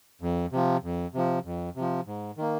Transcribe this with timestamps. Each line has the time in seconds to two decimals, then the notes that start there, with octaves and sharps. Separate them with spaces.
0.21 F2
0.52 C3 F3
0.83 F2
1.14 C3 F3
1.45 F2
1.76 C3 F3
2.07 G#2
2.37 D#3 A#3